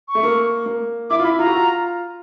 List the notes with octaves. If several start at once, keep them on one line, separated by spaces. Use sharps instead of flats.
C#6
A3
A#3
A#3
E4 D6
F4
E4 B5
F4 A#5
F#4
F4